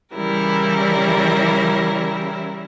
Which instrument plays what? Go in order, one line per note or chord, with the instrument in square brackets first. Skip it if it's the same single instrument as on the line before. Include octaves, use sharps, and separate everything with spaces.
[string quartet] C#3 E3 G3 E4 A#4